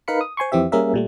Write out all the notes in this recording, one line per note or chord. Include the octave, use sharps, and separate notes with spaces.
D#4 A#4 B4 F5 B5 C#7
D#6
C5 G#5 C6 C#6
F2 E3 C4 G4 E5
G3 A#3 C#4 G#4 A#4 E5
A#2 G3 A3